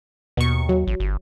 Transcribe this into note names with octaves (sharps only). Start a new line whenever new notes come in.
D#2 B2 C#6
F#3
A1
G1